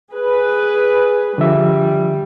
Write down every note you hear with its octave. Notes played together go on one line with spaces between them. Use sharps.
G#4 B4
D3 F3 G3 E5